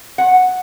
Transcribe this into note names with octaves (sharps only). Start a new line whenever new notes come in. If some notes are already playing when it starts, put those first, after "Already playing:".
F#5